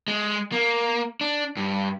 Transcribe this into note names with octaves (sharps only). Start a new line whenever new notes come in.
G#3
A#3
D4
G2